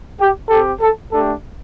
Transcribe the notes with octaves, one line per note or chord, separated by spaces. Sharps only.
G4
C4 G4 A4
A4
A3 D4 G4 A4